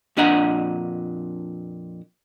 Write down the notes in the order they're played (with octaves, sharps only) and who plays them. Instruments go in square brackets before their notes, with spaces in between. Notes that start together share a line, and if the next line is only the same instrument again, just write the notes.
[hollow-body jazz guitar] F2 A#2 D4 D#5 F#5 A#5